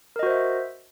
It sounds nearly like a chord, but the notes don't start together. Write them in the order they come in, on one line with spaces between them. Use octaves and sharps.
A#4 D#5 F#4 C5 E5